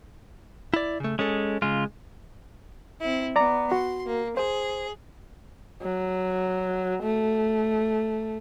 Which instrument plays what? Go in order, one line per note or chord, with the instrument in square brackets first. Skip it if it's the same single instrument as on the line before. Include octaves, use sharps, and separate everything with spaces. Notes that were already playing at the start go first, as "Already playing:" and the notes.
[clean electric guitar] E4 D5
C#3 A3
[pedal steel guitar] G#3 [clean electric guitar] C#4 A4
[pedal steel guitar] C#3 F4 [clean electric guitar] G#3
[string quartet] C4 E4
[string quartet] B3 [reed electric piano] D5 A#5 D6
[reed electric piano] F#4 [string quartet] C6
[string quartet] A#3
[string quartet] G#4 [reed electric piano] C5
[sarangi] F#3
A3